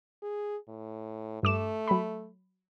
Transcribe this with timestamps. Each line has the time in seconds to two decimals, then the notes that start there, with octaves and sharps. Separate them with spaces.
0.22 G#4
0.68 A2
1.43 G2 A3 D6 E7
1.88 F#3 B5